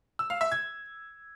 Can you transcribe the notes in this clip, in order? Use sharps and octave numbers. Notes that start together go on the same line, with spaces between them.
E6
F5
E5
G#6